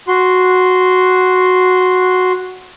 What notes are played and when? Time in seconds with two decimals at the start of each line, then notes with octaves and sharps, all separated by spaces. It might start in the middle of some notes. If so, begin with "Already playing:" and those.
0.08 F#4 C6